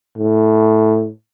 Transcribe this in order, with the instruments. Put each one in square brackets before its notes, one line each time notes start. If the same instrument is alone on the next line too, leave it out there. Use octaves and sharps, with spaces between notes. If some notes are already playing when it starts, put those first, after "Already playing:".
[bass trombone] A2